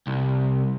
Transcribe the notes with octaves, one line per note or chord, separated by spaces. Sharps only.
C2